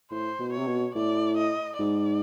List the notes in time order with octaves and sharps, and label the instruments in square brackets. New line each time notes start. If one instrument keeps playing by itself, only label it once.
[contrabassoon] A2 [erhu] C5
[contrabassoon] B2
[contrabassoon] C3 [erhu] C#5
[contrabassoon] B2
[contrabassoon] A2 [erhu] D5
[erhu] D#5
[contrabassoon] G#2 [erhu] D5